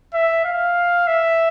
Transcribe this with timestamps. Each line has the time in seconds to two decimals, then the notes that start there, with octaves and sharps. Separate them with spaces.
0.14 E5
0.45 F5
1.07 E5